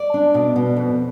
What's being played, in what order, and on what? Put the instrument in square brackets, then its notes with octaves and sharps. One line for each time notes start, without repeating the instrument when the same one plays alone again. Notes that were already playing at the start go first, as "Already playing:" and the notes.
Already playing: [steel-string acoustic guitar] D5
D4
B2
B2
F2